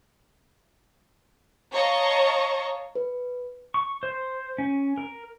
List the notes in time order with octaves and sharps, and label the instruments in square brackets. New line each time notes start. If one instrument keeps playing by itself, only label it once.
[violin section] C#5 D#5 F5 A5 A#5 C#6
[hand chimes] B4
[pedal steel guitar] C#6
C5
C#4
A#4